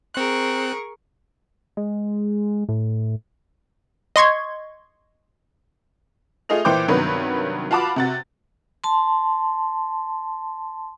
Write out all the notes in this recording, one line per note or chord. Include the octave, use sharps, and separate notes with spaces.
C4 G#4 A#4 C#6 F#6
G#3
A2
D#5 C6 C#6 G#6
A3 F4 G#4 D#5 F7
A#2 E3 C5 G5 D6 G6
G2 C3 D#3 F#3 B3 B4
F4 F#4 A5 B5 D6
C3 F#4 A6
A5 C6